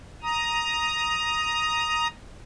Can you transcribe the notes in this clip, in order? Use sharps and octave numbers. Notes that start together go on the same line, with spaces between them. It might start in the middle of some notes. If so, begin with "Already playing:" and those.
A#5 D#6